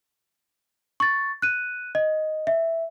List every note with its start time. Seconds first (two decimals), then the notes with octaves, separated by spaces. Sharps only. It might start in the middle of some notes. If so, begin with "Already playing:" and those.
1.00 C#6 A6
1.42 F#6 D#7
1.95 D#5
2.47 E5